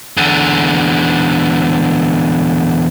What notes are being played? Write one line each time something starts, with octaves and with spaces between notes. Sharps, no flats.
E2 D3